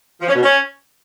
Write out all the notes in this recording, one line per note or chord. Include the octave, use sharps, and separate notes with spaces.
F3
C#4
B2
C#4